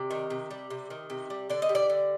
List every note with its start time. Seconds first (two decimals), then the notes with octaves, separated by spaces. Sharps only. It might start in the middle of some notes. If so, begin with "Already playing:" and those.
Already playing: C3 D5
0.11 D#3
0.30 C3
0.51 G3
0.70 C3
0.90 D#3
1.10 C3
1.30 G3
1.50 D3 D5
1.62 D#5
1.69 G3
1.75 D5
1.90 D3